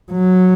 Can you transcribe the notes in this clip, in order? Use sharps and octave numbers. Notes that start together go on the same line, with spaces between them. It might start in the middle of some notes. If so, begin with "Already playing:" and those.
F#3